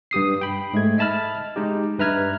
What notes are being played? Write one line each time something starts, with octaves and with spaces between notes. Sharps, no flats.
G2 G4 D#6 C7
G5 B5
G#2 G#3 A3 G#6
D#5 E5 A5 B5 F6
G#3 D#4 G4
G2 B4 E5 A#5 F6 G#6